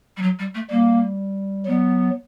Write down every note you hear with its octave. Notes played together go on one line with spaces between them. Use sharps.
G3
F#3
G3
A3
G3 A#3
F#3 B3